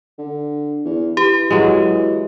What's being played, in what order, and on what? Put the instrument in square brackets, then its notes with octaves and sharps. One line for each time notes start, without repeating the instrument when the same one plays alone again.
[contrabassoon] D3
E2
[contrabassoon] E3 [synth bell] G4
[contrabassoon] E3 [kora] F#3 G#3